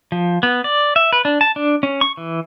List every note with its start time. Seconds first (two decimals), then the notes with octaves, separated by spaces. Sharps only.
0.12 F3
0.43 B3
0.64 D5
0.96 E5
1.13 B4
1.25 D4
1.41 A5
1.56 D4
1.83 C#4
2.01 C#6
2.17 E3